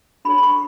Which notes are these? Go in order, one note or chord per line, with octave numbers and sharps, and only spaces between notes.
D4 F#4 A4 C#5 B5
B5
C#6